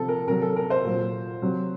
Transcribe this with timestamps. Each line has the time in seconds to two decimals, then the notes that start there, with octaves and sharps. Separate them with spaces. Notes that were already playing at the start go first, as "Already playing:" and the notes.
Already playing: C3 F3 A4
0.08 A#4
0.28 C3 F#3 A#4
0.42 A4
0.56 A#4
0.70 C5
0.84 A#2 F#3
1.42 C3 F#3